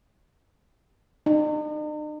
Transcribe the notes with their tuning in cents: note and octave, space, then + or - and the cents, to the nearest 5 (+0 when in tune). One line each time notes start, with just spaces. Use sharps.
D#4 -45